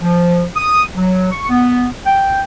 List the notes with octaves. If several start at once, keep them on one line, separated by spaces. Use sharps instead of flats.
F3
D#6
F#3
C#6
B3
G5